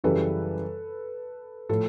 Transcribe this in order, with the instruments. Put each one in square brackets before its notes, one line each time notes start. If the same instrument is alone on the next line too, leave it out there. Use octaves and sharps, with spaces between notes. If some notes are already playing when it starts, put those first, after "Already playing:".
[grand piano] F#2 C#3 E3 G3 [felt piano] A4 B4
[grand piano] A2 F3 [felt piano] A4